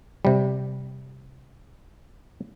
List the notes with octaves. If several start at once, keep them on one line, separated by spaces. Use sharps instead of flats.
C3 G3